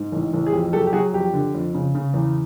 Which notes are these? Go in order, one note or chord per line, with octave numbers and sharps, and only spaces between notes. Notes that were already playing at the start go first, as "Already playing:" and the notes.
Already playing: G#2
A1
A1
G#4
F2 G4
F#3 G4 A4
G4
F#3 F#4 G#4
F2 G4
D3
F2
C#3
C#3
E2